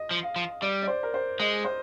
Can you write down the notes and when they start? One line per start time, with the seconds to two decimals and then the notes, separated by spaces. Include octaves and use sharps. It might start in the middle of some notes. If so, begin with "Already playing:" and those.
Already playing: D#5
0.11 F3
0.23 F5
0.36 F3
0.62 G3 D5
0.82 D5
0.87 C5
1.03 A#4
1.14 C5
1.39 G#3 D#5
1.64 C5